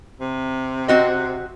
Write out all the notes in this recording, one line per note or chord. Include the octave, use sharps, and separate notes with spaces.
C3
C4 F#4 D#5